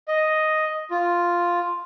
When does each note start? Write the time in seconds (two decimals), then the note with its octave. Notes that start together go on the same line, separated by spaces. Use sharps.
0.08 D#5
0.91 F4